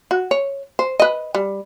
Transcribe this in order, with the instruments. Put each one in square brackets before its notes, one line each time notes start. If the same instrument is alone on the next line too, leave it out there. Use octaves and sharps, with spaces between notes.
[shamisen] F#4
C#5
C5
B4 D#5
G3